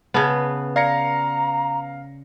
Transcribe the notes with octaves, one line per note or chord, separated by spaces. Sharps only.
C#3 B3 B4 A5
D5 F5 A#5 A#6 C#7